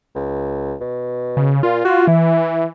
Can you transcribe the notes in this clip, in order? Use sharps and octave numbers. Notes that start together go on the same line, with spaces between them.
C#2
B2
C#3
A#2 F4
F#4
E3 E4